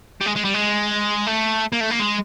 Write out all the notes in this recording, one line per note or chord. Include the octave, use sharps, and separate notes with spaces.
G3
G#3
G#3
G3
G#3
A3
A#3
A3
A#3
G#3